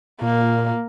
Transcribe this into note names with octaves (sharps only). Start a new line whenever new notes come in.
A#2 A#3